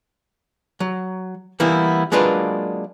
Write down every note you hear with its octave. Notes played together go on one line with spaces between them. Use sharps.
F#3
E3 G3 A#3 B3 E4
F#3 G#3 A#3 D4 F4 B4